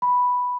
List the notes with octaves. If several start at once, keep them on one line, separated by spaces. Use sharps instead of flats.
B5